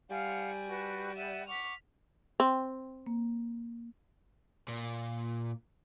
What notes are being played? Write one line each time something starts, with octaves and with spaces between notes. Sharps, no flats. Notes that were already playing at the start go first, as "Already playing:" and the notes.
G3 F5 F#5 G#5
F#4 B4
D5 E5 F#5 D#7 E7
F#5 C#6 D6 F6 B6
C4
A#3
A#2